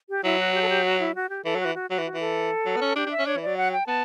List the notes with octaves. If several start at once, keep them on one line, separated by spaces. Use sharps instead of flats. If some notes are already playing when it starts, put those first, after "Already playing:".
G4
F#3 E4
F#4
G4
A4
G4
F#4
E4
F#4
G4
E3 A4
F#3
E3 F#4
F#4
F#3 F#4
E3
F#4
E3
A4
F#3
B3
C#4
D4 G4
D4
E5
C#4
D4 C#5
E3
F#3 D5
F#5
G5
B3 A5